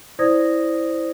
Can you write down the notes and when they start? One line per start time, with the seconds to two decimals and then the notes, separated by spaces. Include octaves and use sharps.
0.19 E4 C5 D5 D#6 G#6 A#6